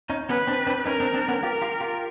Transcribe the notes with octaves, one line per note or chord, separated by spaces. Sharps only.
C#4 D#4
B3 C#4 B4
C4 D4
C4 D4
C#4 D#4 A#4
C4 D4
C4 D4
B3 C#4
F4 G4 A#4
F4 G4
F4 G4